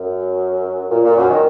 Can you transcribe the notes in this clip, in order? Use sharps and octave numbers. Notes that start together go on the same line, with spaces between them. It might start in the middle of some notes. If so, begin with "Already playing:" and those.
Already playing: F#2
A#2
A#2
F#2
D#3